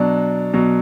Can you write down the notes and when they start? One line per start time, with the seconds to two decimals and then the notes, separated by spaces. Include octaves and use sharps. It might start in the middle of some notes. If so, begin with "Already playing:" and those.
Already playing: B2 F#3 D4
0.53 B2 F#3